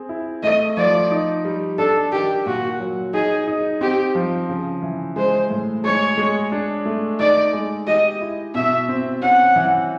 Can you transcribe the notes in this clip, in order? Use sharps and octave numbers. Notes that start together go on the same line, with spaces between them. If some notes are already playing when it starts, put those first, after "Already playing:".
Already playing: C4 G#4
E4
A3 D#5
F3 D5
D#4
G3
D4 A4
D#3 G4
A#2 F#4
F#3
D#4 G#4
D#4
C4 G4
F3
C#3
E3
G#3 C5
A2
G#3 C#5
G#3
D4
A3
D#4 D5
G#3
G4 D#5
E4
B2 E5
C4
C#4 F#5
E3